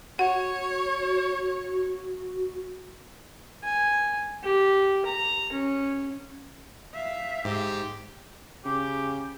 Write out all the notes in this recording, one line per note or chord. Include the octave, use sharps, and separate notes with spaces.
F#4 C#5 F#5
G#5
G4
A#5
C#4
E5 F5
G#2 G4
C#3 G4